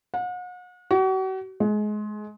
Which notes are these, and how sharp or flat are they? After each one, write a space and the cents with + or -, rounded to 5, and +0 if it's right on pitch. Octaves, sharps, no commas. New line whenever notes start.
F#5 -40
F#4 +40
G#3 +25